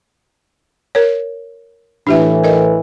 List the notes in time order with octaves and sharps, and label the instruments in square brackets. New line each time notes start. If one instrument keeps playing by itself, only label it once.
[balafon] A#4 C#5
[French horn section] A2 E3 [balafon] D4 G4 E5
[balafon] A#4 D#5